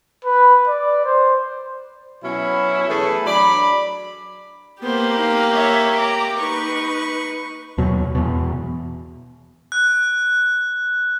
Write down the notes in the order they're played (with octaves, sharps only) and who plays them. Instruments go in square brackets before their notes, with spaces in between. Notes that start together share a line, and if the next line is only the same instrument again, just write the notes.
[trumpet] B4
D5
C5
[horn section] B2 F#3 C#4 E4
E3 A3 G#4 A4 B4
F#3 D4 D5 B5
[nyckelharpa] A#3 G4 [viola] B3 C5
[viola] D#4 F5
C#5 E5
A#5 D6
[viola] D#4 B4 [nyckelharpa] C#6
[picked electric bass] D#2 B2 F#3
E2 B2
[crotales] F#6